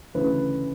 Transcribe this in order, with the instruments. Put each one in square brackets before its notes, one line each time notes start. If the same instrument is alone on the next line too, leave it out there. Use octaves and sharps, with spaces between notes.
[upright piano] D2 C#3 E3 B4